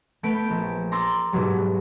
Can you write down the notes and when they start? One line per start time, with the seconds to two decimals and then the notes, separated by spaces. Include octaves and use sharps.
0.23 A3 B3 G6 B6 D7
0.50 A#1
0.92 A#5 C6 D6 E6 A6
1.32 G#2 B2 F#3 G3